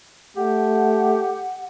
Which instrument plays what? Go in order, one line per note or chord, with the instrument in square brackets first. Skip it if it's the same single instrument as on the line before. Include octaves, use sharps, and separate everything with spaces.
[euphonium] A3 [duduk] G4 [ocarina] F#5